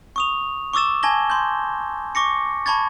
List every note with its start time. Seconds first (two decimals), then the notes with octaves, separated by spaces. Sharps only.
0.16 C#6 D#6 F7
0.73 C#6 D6 E6 A6 E7
1.03 G#5 A5 G#6 A#6 G7
1.30 C6 G6
2.15 C#6 D6 A#6 C#7
2.66 A5 B5 C#6 G#6 A6